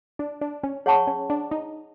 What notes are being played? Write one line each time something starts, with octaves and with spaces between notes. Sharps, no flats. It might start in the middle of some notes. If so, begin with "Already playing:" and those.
D4
D4
C#4
G#4 C#5 F#5 A5 C#6
C#4
D4
D#4